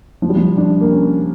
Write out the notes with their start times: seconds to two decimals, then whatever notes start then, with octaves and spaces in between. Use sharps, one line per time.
0.22 F3
0.29 G3
0.36 F3
0.57 D4
0.81 A#3
0.92 C#4